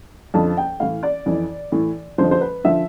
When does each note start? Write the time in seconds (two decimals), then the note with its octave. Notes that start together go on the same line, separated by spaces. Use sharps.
0.34 F2 D3 F3 A5
0.57 G5
0.80 A2 E3 F5
1.03 D5
1.26 F2 E3
1.72 A2 E3
2.18 F2 D3 F3 C5
2.31 C5
2.41 B4
2.64 D3 F3 E5